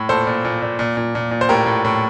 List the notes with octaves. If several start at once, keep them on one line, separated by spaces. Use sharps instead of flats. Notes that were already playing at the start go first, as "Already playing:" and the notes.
Already playing: A2
A#2 A4 C5
A#2
A#2
A#2
A#2
A#2
A#2
A#2
C5
A2 G4 A#4
A2
A2